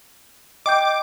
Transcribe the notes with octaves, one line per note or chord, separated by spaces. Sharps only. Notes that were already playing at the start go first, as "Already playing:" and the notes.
D#5 G5 D6 G6